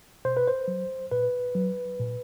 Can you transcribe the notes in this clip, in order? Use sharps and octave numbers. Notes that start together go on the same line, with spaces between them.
B2 C5
B4
C5
F#3
A#2 B4
F#3
A#2